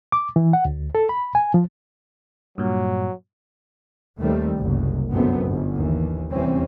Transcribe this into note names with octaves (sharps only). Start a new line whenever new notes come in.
D6
E3
F#5
D2
A4
B5
G#5
F3
G2 A#2 F#3
D#2 D#3 G3 A3 C4
F#1 C2
G1 F#2 A3 B3 C4
G1
D#2 E3
F1 E2 E3 G3 C4 C#4